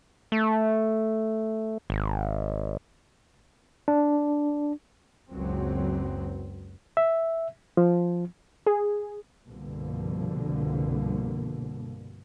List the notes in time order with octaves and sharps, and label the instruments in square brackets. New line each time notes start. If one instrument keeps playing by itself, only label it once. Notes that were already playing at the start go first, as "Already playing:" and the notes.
[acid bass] A3
G#1
[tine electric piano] D4
[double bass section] F#1 C#2 F#3 C4
[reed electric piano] E5
F3
[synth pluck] G#4
[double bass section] C2 G2 B2 D3 F3 A#3